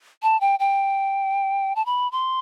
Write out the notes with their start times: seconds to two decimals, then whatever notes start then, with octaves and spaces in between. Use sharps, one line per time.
0.23 A5
0.41 G5
0.60 G5
1.76 A5
1.86 B5
2.12 C6